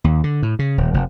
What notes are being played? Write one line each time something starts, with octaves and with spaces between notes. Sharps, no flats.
D#2
D3
A2
C#3
D#1
F1